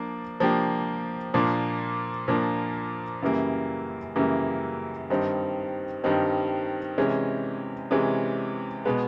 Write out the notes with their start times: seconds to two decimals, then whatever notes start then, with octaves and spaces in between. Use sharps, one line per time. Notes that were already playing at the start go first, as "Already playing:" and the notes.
Already playing: F3 A#3 D4
0.40 F3 A#3 D4 G4
1.34 A#2 F3 A#3 D4
2.28 A#2 F3 A#3 D4
3.22 F#2 C#3 E3 G3 A#3
4.16 F#2 C#3 E3 G3 A#3
5.10 G2 D#3 G3 C4 D#4
6.04 G2 D#3 G3 C4 D#4
6.98 C3 E3 G#3 C#4
7.91 C3 E3 G#3 C#4
8.85 B2 G#3 B3